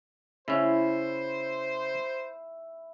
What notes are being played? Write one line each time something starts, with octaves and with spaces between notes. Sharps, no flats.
C#3 C#4 E4 C5